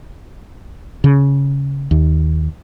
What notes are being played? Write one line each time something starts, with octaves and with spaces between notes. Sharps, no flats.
C#3
D#2